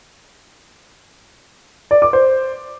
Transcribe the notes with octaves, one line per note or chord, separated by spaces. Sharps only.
D5
D6
C5